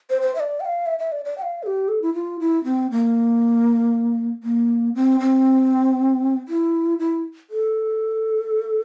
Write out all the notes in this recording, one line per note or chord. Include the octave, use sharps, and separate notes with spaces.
C5
C5
E5
D5
G5
F5
E5
E5
D5
D5
G5
F5
A4
G4
A4
E4
F4
E4
C4
A#3
A#3
C4
C4
E4
E4
A4